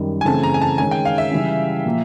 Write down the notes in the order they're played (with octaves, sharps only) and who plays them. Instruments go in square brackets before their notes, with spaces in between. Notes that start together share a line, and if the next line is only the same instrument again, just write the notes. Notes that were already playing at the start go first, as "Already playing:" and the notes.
Already playing: [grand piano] F#2 D#3 G3
[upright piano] G#5
[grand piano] C#3 E3 A3 C4 [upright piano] A5
[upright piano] A#5
G#5
A5
[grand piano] D#3 G#3 C#4 [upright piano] G#5
[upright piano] G5
F5
E5
[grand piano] C#3 E3 G3
A#2 F3 A#3